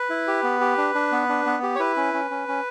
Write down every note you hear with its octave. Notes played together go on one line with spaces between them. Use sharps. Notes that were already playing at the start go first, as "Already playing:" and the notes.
Already playing: B4
E4
G4
B3
G4
D4
D4
B3
D4
B3
G4
C#5
E4 B4
C#4
C#4
C#4
C#4